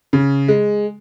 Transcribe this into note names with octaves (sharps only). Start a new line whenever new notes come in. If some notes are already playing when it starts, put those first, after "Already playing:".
C#3
G#3